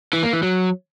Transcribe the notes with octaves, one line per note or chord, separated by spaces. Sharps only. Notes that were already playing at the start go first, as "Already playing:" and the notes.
E3
A#3
E3
F#3